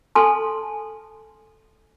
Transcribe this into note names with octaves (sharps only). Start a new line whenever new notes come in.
A4 G#5 A5 C6